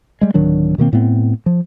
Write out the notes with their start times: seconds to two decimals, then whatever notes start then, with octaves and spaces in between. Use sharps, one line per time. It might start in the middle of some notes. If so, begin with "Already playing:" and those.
0.21 G3 G#3
0.34 D1 D#3 F#3 D4
0.78 B2 D#3 A#3 C4
0.93 A2 A3 B3 C4
1.46 F3